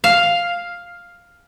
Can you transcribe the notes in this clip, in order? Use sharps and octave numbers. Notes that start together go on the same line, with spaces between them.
F5